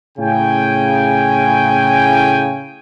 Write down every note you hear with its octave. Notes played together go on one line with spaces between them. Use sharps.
A2 C#3 G5 G#5